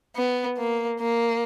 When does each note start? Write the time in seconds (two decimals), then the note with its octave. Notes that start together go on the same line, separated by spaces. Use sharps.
0.16 B3
0.58 A#3
1.00 A#3